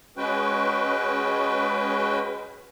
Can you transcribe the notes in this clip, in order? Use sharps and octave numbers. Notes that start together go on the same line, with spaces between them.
G#3 C#4 F#4 B4 G5